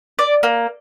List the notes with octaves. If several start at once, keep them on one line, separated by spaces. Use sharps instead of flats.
D5
A#3